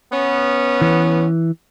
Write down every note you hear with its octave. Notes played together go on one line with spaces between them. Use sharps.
B3 C#4
E3